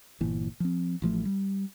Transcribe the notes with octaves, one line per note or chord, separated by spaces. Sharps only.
G1 A#2 E3
F3 C4
A1 F3 A3
G3